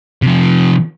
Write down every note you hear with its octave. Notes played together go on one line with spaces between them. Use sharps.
C3 F3